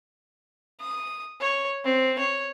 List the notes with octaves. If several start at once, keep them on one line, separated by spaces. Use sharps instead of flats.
D#6
C#5
C4
C#5